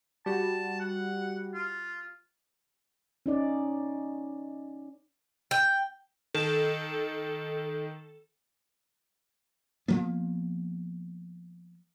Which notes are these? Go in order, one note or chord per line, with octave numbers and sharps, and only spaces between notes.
G3 F#4 A5
F#5
F4
C#4 D#4 D5
G5
D#3 A4
F3 A#3 B3